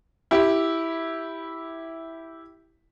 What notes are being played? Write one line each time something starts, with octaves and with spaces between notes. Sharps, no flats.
E4 G4